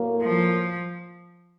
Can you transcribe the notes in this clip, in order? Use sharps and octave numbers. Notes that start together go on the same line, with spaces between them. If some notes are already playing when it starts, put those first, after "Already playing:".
Already playing: A2 F#3 A#3
F3